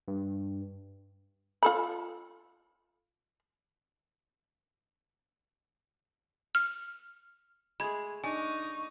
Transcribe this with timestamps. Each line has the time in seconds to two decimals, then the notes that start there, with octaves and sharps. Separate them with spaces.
0.08 G2
1.63 F4 A4 B5
6.55 F6
7.80 G#3 A3 G#4 B5 G#6
8.24 D4 D#4 G#5 C#6